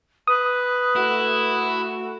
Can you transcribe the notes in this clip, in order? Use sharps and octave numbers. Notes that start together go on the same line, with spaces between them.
B4 D#6
A3 E4 F#4